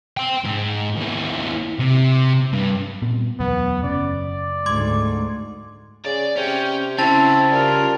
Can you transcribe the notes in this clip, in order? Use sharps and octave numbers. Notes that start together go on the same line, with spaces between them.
G5 C6
G#2
D#2 E4
C3
G2
A#2 B3 C4
E1 D2 F#3 B3
F#1 C#4 D5
D2 G#2 C6 D6 G#6
C#3 G#4 D5
C3 C#4 G5
C#3 C4 C#4 E4 A5 A6
G3 F4 A#4